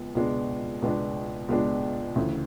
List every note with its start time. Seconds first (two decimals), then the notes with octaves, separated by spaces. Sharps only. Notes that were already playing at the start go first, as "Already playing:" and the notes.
Already playing: C#2 G#3 B3
0.15 C#2 B2 G#3 B3 D4
0.82 C#2 B2 G#3 B3 D4
1.49 C#2 B2 G#3 B3 D4
2.16 D2 C#3 E3